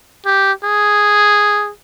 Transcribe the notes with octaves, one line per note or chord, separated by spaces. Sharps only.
G4
G#4